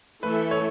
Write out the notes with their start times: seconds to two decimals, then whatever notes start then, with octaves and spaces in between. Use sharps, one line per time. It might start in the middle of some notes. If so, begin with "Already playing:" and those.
0.23 E3 A3 E4 A4 B4 E5
0.51 C#5